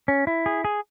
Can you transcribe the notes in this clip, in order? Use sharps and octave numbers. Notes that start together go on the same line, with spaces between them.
C#4
E4
G#4
G#4